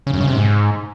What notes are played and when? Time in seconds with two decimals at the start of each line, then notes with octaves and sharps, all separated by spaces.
0.07 C#3
0.14 F#2
0.21 C#3
0.28 C3
0.34 G#2